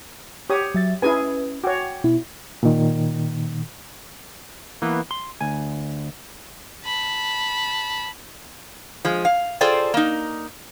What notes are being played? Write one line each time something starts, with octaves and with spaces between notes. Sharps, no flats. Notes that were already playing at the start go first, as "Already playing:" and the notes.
G4 C#5 D#6
F#3 E5 A6
C#4 E4 G#4 B4 G#5
F#4 C#5 G5 G#5 D6
B2 E4
A#2 D#3
E3 A#3 B3
C6
D2 G#5
A5 B5
F3 G#3
F5
F4 G#4 A4 C5 D5 G5
A#3 D#4